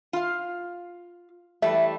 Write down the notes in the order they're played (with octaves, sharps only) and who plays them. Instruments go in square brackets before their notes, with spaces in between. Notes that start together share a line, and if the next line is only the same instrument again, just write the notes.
[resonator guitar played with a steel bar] F4 F5
[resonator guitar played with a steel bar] E3 G3 A3 [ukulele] E5